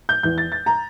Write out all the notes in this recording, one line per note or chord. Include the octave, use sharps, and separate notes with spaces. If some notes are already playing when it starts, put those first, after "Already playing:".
G6
E2 E3 G6
A6
A6
A#5